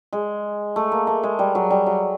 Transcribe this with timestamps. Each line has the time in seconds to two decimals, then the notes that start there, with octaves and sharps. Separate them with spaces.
0.13 G#3
0.76 A3
0.92 A#3
1.07 A3
1.23 G#3
1.39 G3
1.55 F#3
1.70 G3
1.86 F#3